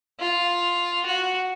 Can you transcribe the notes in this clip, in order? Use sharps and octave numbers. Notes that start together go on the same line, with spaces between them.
F4
F#4